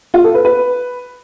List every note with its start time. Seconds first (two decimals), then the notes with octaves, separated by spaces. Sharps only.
0.14 F4
0.24 A4
0.34 B4
0.45 B4